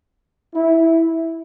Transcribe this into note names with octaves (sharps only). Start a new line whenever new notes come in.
E4